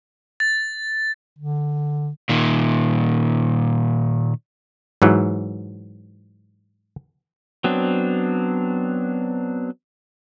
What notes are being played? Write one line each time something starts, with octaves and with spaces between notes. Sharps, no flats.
A6
D3
A#2 D#3
G#2 E3 F#3
F#3 B3 C4 D4